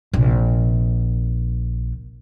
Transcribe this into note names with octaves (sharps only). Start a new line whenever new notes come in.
A#1 C3